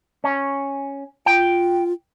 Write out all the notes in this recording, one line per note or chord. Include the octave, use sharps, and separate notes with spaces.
C#4
F4 G5